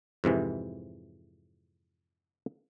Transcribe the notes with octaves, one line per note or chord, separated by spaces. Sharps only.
F2 G#2 C3 E3